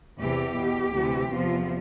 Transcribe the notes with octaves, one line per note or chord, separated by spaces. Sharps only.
E2 C3 E3 G4
E2 B2
D2 C3 E3
E2 C3 F3 F4